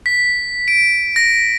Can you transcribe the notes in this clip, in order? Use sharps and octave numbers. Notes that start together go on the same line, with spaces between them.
B6
D7
A#6